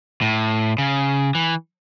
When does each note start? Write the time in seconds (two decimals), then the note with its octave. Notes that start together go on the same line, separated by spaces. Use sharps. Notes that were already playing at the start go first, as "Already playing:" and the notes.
0.21 A2
0.78 C#3
1.35 E3